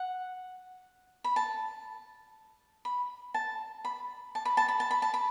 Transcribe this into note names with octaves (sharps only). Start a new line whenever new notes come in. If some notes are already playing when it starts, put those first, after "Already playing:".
Already playing: F#5
B5
A5
B5
A5
B5
A5
B5
A5
B5
A5
B5
A5
B5